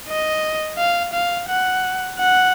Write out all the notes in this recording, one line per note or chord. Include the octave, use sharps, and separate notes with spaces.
D#5
F5
F5
F#5
F#5